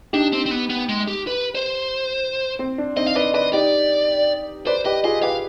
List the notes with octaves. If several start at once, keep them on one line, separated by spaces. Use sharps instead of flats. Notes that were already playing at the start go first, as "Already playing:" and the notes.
D4 D#4 G4
C4
C4
B3
B3
G#3
G4
B4
C5
C4
D4
C4 D#4 D#5
F5
B4 D5 D#5
B4 D5 D#5
D#4 G4 D5
B4 C5 D5
G4 B4 D#5
F4 G#4 D#5
G4 B4 F5